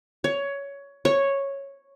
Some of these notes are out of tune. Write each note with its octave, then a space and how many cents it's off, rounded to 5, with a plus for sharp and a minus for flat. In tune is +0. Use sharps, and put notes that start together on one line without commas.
C#5 +15
C#5 -5